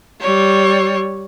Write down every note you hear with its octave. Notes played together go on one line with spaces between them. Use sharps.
G3 C#5